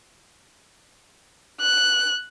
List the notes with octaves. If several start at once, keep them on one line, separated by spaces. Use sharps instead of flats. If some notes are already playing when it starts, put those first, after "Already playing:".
F#6